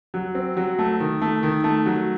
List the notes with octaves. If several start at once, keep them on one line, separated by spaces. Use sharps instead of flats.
F#3
C4
F#3
A3
D#3
A3
D#3
A3
F#3